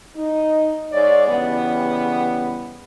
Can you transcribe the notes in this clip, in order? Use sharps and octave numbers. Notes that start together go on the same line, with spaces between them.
D#4
G#2 C#5 D5
C#3 E3 G3 B3